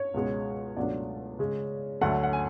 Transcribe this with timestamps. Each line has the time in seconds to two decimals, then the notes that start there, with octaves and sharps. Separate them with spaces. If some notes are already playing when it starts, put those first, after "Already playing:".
Already playing: C#5
0.14 C#2 B2 G#3 C#4
0.77 C#2 B2 F#3 A3 D4 D5
1.39 C#3 G#3 C#4
2.01 D2 D3 F#3 A3 F#5
2.23 F#5
2.33 G#5